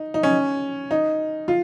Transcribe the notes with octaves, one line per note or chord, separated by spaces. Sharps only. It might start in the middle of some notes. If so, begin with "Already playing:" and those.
Already playing: D#4
D#4
C#4
D#4
F4